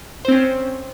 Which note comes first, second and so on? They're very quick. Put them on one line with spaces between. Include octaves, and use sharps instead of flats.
C5 C4 C#4